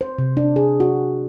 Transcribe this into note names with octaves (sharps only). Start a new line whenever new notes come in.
C5
C3
D4
G#4
F#4